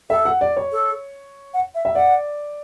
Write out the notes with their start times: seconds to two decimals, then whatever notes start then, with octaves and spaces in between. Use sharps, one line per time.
0.10 A4 E5
0.25 F#5
0.41 D5
0.57 C#5
0.72 A4
1.54 F#5
1.75 E5
1.85 E5
1.95 D5 F#5